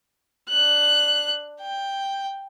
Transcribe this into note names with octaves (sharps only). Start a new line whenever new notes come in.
D4 F#6
G5